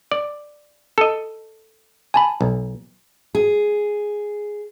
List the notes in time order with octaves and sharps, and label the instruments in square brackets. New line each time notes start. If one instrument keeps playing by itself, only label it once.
[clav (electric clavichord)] D5
A4 D#5
[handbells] G#5 A5 B5
[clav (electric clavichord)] B1
[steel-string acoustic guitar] G#4